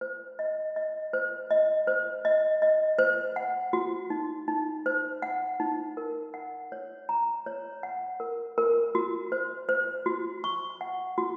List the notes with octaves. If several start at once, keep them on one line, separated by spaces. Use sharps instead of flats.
C5
D#5
D#5
C5
D#5
C5
D#5
D#5
C5
F#5
F#4
D#4
D#4
C5
F#5
D#4
A#4
F#5
C#5
A#5
C#5
F#5
A#4
A#4
F#4
C5
C5
F#4
C#6
F#5
F#4